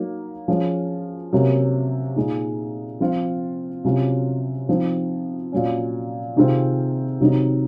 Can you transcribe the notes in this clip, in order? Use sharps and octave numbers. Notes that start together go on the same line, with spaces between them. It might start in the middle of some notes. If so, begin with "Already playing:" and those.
Already playing: F#3 A#3 D#4
F3 G#3 C#4
C3 F#3 A#3 C#4
A#2 G#3 D#4
F3 C4 F4
C3 F#3 C#4 F4
F3 C4 D#4
A#2 F#3 C#4
C3 D#3 G#3 C4 F4
C3 D#3 F#3 C4 D#4